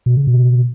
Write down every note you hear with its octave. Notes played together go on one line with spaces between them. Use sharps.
B2
C#3
B2